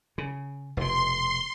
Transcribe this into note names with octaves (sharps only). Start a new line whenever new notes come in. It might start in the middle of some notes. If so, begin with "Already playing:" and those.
C#3
F1 B2 C6